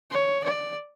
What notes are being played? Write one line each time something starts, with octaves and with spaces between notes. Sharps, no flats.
C#5
D5